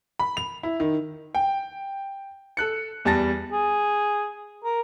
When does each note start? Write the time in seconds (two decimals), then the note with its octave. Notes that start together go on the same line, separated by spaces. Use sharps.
0.19 B5
0.37 F7
0.63 E4
0.80 D#3
1.35 G5
2.57 A4 F#6 C#7
3.05 E2 G3 A5 A6 A#6
3.52 G#4
4.64 A#4